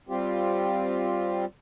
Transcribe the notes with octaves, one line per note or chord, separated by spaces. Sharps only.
G3 C4 F4 G4